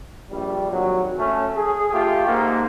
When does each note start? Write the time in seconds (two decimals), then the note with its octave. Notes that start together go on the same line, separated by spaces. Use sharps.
0.30 A#1 G3
0.72 G#1 F#3
1.18 A3 C#4
1.57 G#4
1.92 A3 F4 G4
2.28 G#2 A#3